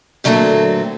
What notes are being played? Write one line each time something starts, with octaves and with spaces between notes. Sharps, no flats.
A#2 D3 F#3 A3 C4